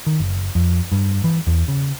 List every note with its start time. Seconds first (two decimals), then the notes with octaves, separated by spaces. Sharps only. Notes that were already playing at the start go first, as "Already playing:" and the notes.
0.07 D#3
0.20 F#1
0.55 F2
0.92 G2
1.24 E3
1.47 E2
1.68 C#3